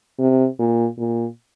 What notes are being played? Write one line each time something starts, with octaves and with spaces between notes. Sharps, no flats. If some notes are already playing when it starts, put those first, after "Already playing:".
C3
A#2
A#2